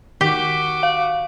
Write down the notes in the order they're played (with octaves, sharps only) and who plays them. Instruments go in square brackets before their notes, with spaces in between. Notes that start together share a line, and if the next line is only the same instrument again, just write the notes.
[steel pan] D#3 [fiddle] F#4 D6 [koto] G4 [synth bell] B6 G7
[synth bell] F5